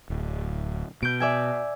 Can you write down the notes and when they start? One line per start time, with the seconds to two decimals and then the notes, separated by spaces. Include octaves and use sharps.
0.10 D1
1.03 B2 G6 D7
1.20 D5 E5 G#5